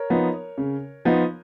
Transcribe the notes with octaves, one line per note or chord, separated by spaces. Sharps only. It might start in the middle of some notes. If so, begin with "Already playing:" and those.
Already playing: A#4 C#5
F3 B3 D#4
C#3
F3 B3 D#4